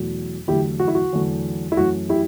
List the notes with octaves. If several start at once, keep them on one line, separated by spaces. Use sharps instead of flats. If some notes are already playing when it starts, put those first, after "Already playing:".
Already playing: E2 B2 F#3 A3
E2 D3 F#3 A3 E4 G4
F#4
E4
F#4
E2 D3 F#3 A3
E4
F#2 E3 A3 F#4
E4 G4